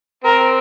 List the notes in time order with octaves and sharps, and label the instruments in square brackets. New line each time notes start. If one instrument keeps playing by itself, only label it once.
[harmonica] C4 [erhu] A#4